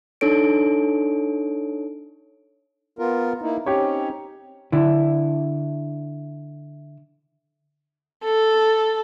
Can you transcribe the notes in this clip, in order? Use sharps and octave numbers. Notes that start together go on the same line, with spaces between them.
D4 D#4 A4 C#5 D7
B3 F4 A#4
A#3 D#4 E4
C4 C#4 D#4 G4 C#5
D3 D4 E4
A4